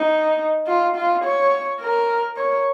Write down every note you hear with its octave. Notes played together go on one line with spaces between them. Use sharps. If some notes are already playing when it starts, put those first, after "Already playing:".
Already playing: D#4
F4
F4
C#5
A#4
C#5